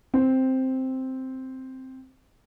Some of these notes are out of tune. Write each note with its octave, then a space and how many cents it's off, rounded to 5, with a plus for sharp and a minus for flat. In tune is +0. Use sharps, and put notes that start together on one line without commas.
C4 +0 C5 +0